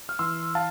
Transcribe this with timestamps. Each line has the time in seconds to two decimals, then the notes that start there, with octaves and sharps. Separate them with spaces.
0.09 F6
0.19 E3 C6 E6
0.55 F5 A5